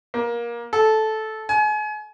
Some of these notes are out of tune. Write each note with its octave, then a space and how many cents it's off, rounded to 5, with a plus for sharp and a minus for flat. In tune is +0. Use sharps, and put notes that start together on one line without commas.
A#3 +20
A4 -10
G#5 +35